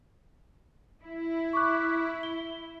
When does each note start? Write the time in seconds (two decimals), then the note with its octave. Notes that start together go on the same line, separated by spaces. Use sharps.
1.03 E4
1.53 C#6 D6 F#6
2.23 G7